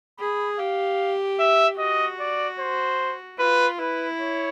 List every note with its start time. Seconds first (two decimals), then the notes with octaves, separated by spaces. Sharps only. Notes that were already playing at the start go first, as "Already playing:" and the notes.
0.19 G#4 B5
0.59 G4 F5
1.39 E5
1.79 F#4 D#5
2.20 D5
2.59 C5
3.39 F4 B4
3.79 E4 B4
4.19 C#5